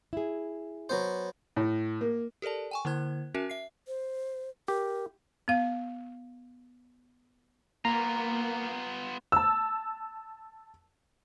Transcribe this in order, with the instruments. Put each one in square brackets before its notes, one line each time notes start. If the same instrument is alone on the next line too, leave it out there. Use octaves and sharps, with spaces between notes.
[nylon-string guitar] E4 G#4
[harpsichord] F#3 B3 C5
[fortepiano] A2
A#3
[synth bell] G4 A4 A#4 D5 A5
G5 G#5 C#6
D3 A#3 E4 C5 F#6 G#6
C#4 F#4 A#4 E5 G#5
E5 C7
[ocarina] C5
[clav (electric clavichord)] G4 [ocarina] A#4
[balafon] B3 F5
[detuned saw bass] A#3 [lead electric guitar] B3 F4 [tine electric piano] A#5
[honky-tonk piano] A5 E6